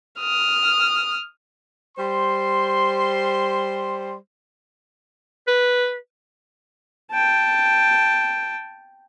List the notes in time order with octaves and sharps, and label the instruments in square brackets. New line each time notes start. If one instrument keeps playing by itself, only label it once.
[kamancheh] D#6 F6
[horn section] G3 C5 C6
[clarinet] B4
[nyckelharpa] G5 A5